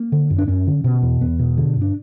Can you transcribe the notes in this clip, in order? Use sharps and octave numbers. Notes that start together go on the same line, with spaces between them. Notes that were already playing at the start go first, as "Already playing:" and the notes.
Already playing: A#3
D3
F#2
D4
F#2 C#4
D3
B2
E2
E2 B3
B2
D3
G2
D4